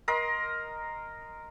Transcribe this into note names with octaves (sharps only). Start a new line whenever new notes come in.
A#4 D#5 C6